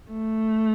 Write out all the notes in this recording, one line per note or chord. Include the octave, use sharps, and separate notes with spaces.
A3